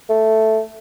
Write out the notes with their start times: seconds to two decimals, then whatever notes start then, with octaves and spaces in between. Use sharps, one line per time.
0.09 A3